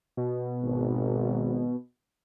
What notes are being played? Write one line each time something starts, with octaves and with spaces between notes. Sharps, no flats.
B2
G#1